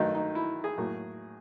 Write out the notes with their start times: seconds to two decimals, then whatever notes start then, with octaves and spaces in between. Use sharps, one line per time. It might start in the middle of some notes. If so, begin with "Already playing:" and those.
Already playing: G2 D#3 F#3 A3 D#4
0.15 D#4
0.35 E4
0.64 G#4
0.78 A2 F#3 A#3